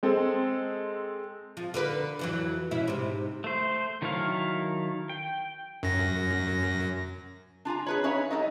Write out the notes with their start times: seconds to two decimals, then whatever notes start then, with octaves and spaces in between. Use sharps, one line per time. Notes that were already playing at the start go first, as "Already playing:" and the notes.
0.03 G#3 C4 A4
1.57 F3
1.74 D3 A#4 B4
2.19 F2 E3 F#3
2.71 B2 C#4 E4
2.88 G#2 C3
3.44 A3 C5
4.02 D#3 F#3 E4 A4 F5
5.09 G5
5.83 F#2 A#6
7.65 D4 F4 G#5 A#5
7.87 G#4 B4 C#5
8.04 C#4 D#4 B4 C#5 E5 F5
8.31 G3 D#4 A4 D#5